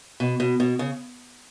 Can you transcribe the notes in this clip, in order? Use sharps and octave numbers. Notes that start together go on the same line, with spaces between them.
B2
B2
B2
C#3